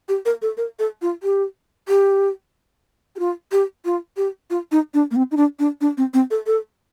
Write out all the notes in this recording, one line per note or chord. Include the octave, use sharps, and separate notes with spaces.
G4
A#4
A4
A#4
A4
F4
G4
G4
G4
F4
G4
F4
G4
F4
D#4
D4
A#3
C4
D#4
D4
D4
D4
C4
C4
A4
A4